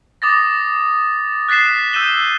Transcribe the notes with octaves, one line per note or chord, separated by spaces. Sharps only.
D6 D#6 A6 A#6
F#6 A6 B6 C7 E7
E6 G6 D#7 E7 G7